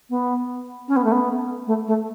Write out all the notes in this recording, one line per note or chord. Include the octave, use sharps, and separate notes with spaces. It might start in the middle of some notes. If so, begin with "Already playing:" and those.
B3
C#4
B3
A3
B3
A3
A3